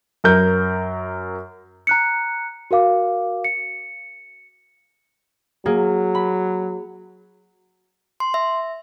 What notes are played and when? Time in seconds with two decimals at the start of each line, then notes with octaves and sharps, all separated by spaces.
0.24 F#2 A#4 G6
1.87 A#5 F#6 C#7
2.71 F#4 A#4 F5 D6
3.44 C#7
5.66 F#3 A#3 G#4
6.15 B5
8.20 C6
8.34 E5